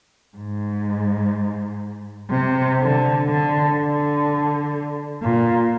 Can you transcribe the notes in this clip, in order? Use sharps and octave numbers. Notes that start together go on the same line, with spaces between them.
G#2
C3
D3
D3
D3
A#2